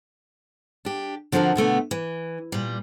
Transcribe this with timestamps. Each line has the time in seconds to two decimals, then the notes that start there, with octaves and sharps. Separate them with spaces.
0.85 D4 G4
1.32 D3 F3 C4 F#4 G4 A#4
1.56 B2 D3 A3 B3
1.91 E3
2.52 A#2 G3